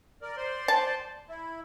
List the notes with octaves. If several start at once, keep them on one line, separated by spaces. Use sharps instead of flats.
A#4 D5
C5 D5 C6
A5
E4